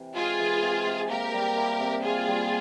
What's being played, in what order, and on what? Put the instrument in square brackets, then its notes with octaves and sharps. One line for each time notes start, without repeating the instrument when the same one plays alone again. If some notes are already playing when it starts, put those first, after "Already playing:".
Already playing: [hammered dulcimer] C3 E3
[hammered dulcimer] G#3 [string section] F4 G#4
[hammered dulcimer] E3
C3
C3
[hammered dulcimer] A#3 [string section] G4 A#4
[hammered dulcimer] G3
E4
C3
[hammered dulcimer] A#3 [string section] F4 G#4
[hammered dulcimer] G3